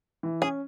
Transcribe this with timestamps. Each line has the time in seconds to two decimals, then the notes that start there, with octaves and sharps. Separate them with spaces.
0.23 E3
0.42 C#4 G#4